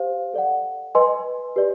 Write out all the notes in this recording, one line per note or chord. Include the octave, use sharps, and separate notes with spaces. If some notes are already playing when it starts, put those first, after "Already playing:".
Already playing: G4 C5 F5
A4 D5 F#5
B4 D#5 G#5 C6
G4 B4 D5